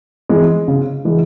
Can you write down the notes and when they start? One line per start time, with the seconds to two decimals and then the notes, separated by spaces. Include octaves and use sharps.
0.29 E3 G#3
0.68 C#3
1.05 E3 G#3